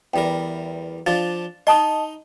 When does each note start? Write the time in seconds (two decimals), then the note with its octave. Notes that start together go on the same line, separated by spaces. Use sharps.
0.14 E2 G3 A#4 G5
1.07 F3 D4 F4 A6
1.67 D#4 D#5 A5 C6 D#6